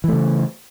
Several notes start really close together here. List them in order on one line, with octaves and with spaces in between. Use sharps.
E3 A3 C#3